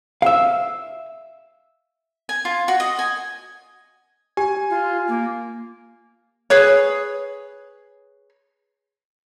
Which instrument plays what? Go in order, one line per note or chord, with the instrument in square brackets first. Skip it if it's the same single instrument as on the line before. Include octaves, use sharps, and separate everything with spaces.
[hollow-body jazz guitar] E5 F5
[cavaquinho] G#5
F4
F#4
D#5
G#5
[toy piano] G4 [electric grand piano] G#5
[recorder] F4
A#3
[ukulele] G#4 B4 C#5